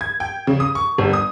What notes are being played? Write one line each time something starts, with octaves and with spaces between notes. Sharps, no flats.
G#6
G5
C#3
D#6
C#6
G1
D#6